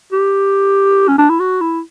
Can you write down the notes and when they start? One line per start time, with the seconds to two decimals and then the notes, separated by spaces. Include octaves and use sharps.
0.13 G4
1.08 C#4
1.18 D4
1.30 E4
1.40 F#4
1.61 E4